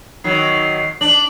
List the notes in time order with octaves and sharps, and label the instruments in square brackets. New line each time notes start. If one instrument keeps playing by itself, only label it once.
[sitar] D#3 F#3 [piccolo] C7
[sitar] D4 [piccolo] F#7